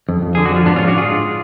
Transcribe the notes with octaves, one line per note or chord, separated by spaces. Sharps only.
F2
F2
D3 G#4
F#4
F3 F4
G#2 B3 D4
G#2 C#4 F4
D4 F#4
G#2 F4 G#4
G#2